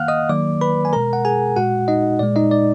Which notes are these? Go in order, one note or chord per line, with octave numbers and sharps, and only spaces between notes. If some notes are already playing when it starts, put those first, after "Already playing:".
Already playing: D#3 A#3 F5 F#5 F6 F#6
D#5 D#6
D#3 F#3 A#3 D5 D6
B4 B5
G#5
B2 G#3 A#4 A#5
F#5
G#4 G#5
A#2 G#3 F#4 F#5
D#4 D#5
A#2 G#3 D5
D#4 D#5
D5